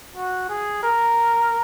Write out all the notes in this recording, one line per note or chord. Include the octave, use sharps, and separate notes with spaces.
F#4
G#4
A#4